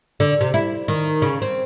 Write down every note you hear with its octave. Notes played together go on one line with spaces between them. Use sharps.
D3
C3
E4
D#3
C#3
C4